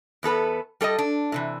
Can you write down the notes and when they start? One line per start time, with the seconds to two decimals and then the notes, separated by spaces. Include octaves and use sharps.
0.23 E2 B3 A4 B4
0.81 G3 A4 C#5 D#5
0.98 D4
1.32 A2 C3 E3